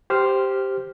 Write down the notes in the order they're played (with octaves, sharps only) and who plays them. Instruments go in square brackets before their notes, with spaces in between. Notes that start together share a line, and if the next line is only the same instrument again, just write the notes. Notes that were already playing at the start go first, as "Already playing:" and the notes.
[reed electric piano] G4 C5 F6